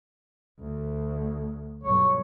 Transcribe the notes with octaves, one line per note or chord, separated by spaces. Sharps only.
D2
B1 G2 C#5